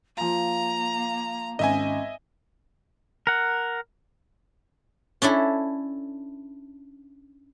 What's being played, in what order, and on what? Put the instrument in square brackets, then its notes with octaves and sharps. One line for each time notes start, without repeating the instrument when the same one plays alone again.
[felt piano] F3 F4 [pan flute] A#3 [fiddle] A#5
[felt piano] G#1 [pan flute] C#4 [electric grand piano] D#5 E5 G#5
[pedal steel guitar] A#4 F#5
[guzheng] C#4 D4 E4 A4